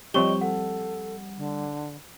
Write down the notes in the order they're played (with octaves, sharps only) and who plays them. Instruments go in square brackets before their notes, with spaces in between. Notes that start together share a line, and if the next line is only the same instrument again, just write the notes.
[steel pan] F3 C4 G4 [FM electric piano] G3 [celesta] C#5 C#6 G7 [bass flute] D#5
[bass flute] A4 [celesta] F#5
[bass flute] D3